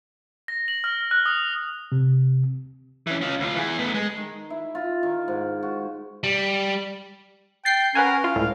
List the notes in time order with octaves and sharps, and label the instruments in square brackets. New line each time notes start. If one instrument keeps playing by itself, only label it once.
[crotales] A#6
F#7
F6
F#6
D#6
[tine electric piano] C3
[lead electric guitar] E3 C#4
C#4 F4
D2 F4
E3 G#4
A3 B3
G#3
[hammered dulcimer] D#3
E4
F4
D#3
G#2
F#4
[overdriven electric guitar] G3
[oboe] G5 [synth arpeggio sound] A6 C7
[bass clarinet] C#4 [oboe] A#4 [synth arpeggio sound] B4 F#5 G#5
[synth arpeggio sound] F4 [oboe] F5
[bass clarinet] C#2 [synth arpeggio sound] A2